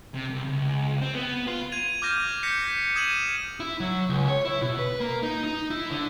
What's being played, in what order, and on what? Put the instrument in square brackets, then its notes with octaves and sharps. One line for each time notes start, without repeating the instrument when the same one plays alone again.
[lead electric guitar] C3
C2
C#2
C4
B3
F4
[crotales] G#6 D#7 F7
D6 F6 G6 A#6 D#7
G6 A#6 B6 C#7
D#6 G#6 D#7 E7 F#7
[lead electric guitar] E4
F#3
C#2
C#5
E4
B2
B4
A#3
D#4
D#4
E4
D3